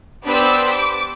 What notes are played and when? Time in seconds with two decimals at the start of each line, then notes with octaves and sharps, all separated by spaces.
0.24 B3 D4 G4 B4 C5 E6
0.71 D6